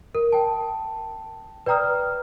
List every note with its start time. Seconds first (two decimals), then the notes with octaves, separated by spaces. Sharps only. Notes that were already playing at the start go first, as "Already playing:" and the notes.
0.15 A#4
0.32 G5 A5
1.66 B4 D5 G5 A#5 D#6 F6